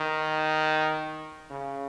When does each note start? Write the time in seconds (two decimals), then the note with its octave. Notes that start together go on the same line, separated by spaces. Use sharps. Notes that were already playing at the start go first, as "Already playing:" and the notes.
Already playing: D#3
1.50 C#3